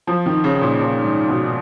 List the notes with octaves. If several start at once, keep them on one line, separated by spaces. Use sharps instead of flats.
F3
D#3
C#3
A#2
A#2
G#2
B2